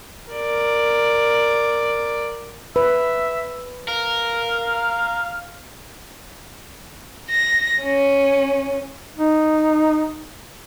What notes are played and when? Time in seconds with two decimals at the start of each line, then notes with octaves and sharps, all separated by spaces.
0.31 A#4 D5
2.76 B4 E5
3.88 A#4 F5
7.30 A#6
7.83 C#4
9.17 D#4